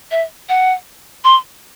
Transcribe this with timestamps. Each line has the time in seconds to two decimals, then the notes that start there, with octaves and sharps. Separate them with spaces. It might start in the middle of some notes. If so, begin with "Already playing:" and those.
0.11 E5
0.49 F#5
1.24 C6